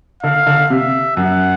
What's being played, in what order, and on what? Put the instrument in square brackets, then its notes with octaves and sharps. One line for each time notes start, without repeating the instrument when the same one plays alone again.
[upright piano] D3 [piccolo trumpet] F5
[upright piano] D3
[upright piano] C3 [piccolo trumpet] E5
[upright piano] F#2 [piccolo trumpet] F#5